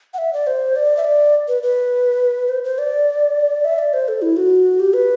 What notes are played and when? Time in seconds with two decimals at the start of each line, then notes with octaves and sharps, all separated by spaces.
0.14 F#5
0.18 E5
0.33 D5
0.47 C5
0.76 D5
0.97 E5
1.04 D5
1.48 B4
1.63 B4
2.49 C5
2.64 C5
2.78 D5
3.65 E5
3.79 D5
3.93 C5
4.08 A4
4.22 E4
4.37 F#4
4.80 G4
4.94 B4